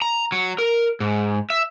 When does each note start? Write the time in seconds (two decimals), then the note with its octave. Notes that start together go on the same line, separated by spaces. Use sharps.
0.02 A#5
0.32 F#3
0.58 A#4
1.00 G#2
1.50 E5